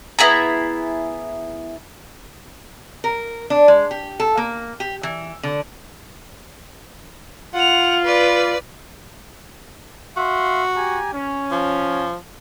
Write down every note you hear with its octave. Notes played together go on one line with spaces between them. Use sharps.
B3 E4 G#4 A#5
A#4
D4
G#3
G4
A4
A#3
G4
E3
D3
F4 F#5 F7
B4 D5
F#4 E5 F5 C6
G4 G#5 A#5
C#4
F3